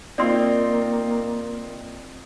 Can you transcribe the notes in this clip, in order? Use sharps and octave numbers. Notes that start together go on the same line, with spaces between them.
A#3 C4 D#4 F4 D5 C6